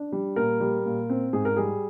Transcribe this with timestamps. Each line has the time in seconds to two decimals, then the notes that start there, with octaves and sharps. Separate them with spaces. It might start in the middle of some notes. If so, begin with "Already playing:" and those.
Already playing: D4
0.12 G3
0.36 A#2 A#4
0.60 G3
0.85 A#2
1.09 C4
1.33 G#2 G#4
1.45 A#4
1.56 G3 G#4